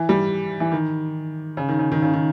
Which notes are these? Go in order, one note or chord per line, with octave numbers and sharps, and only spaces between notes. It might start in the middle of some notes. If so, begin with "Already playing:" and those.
Already playing: E3
G3
E3
D#3
C#3
D#3
C#3
D#3
C#3
D#3